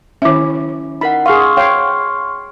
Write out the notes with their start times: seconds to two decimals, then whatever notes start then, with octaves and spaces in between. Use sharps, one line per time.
0.22 D#3 C#4 E4 E5
1.01 D#4 A#4 F#5 B5
1.26 G#4 F5 C6 C#6 F6
1.57 C#5 F5 G5